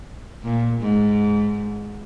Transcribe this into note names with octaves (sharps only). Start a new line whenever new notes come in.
A#2
G#2